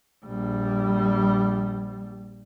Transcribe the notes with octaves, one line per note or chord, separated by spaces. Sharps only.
A#1 G3